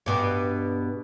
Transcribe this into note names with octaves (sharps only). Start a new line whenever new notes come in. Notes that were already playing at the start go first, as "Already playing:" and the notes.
G2 B2